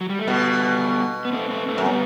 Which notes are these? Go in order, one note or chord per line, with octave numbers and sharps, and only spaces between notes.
F#3
G3
A3
B2 G3 B3
B3
A3 C4
A3 C4
A3 C4
F#2
G3 B3